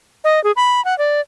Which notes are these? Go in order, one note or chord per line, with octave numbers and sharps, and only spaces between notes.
D#5
G#4
B5
F#5
D5